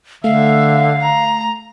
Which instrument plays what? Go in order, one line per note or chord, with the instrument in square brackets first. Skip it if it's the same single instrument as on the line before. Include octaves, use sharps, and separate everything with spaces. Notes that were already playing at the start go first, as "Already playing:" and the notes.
[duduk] D3 [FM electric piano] A3 [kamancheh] E5 [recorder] F5
[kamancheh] A#5